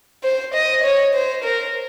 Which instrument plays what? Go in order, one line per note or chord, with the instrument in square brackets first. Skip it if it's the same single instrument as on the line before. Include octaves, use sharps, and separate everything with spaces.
[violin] C5
D#5
C#5
C5
A#4